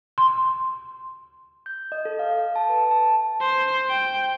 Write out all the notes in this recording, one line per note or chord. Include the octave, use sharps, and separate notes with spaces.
C6
G6
D#5
A4
F5
A5
B4
A5
C5
G5